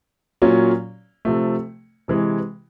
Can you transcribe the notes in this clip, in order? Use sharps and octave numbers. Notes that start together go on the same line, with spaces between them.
A#2 F#3 A#3 C#4 F4
C3 F3 A3
C3 E3 G#3